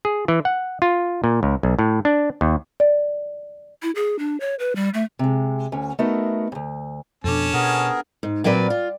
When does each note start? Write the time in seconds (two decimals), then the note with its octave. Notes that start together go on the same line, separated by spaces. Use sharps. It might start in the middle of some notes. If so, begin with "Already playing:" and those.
0.05 G#4
0.28 E3
0.45 F#5
0.82 F4
1.24 A#2
1.43 C#2
1.63 B1
1.79 A2
2.05 D4
2.41 D#2
2.80 D5
3.83 E4
3.95 G#4
4.19 D4
4.40 C#5
4.59 B4
4.76 G3
4.94 A3
5.19 C3 G#3
5.72 D2 C#4
5.99 A3 B3 D#4 F#4 A#4 E5
6.52 D2 G2
7.24 F2 B2 C#4 D4 A4 A5
7.53 B2 B3 G#4 A#4
8.23 G#2
8.44 A#2 F#3 C4 B4 D5
8.70 F4